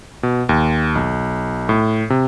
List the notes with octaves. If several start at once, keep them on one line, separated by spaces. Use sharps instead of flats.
B2
D#2
B1
A2
C3